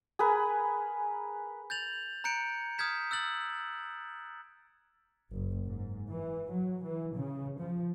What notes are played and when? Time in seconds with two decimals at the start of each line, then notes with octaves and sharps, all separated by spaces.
0.19 G#4 A#4 B4 G#5
1.70 G6 A6 F7 F#7
2.24 A#5 F#6 G6 C#7 D7
2.78 D#6 F6 G6 G#6 B6 E7
3.11 E6 F#6 A6 F#7
5.32 F#1
5.66 G#2
6.12 E3
6.51 F#3
6.84 E3
7.16 C#3
7.59 F3